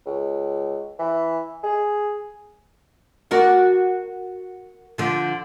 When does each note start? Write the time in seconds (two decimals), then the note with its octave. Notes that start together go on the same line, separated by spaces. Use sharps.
0.06 C#2
0.99 E3
1.63 G#4
3.31 F#4 A#4 D5
4.98 D3 F3